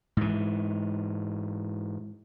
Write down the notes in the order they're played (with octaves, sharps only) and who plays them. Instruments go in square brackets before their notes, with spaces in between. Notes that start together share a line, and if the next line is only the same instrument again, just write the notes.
[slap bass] G#2 E3